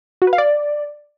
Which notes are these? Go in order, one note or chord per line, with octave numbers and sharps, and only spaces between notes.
F#4
B4
F5
D5